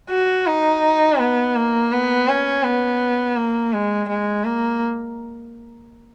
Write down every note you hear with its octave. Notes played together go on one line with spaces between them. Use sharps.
F#4
D#4
B3
A#3
B3
C#4
B3
A#3
G#3
G#3
A#3